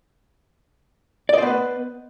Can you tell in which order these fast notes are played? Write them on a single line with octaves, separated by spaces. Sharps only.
D5 D#5 C5 B3 B4